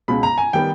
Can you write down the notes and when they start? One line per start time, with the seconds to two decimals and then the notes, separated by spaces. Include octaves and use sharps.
0.08 C#2 B2 G#3 B5
0.23 A#5
0.38 G#5
0.53 D#3 G3 B3 G5